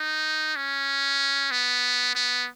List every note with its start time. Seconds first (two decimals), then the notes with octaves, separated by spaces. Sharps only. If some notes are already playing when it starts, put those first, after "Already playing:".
Already playing: D#4
0.56 C#4
1.51 B3
2.15 B3